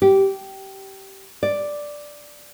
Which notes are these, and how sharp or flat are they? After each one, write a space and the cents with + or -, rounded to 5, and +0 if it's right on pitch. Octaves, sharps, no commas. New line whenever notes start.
G4 -15
D5 +0